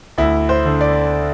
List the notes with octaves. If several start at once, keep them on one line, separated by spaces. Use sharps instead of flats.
D2 E4
C5
D3
D5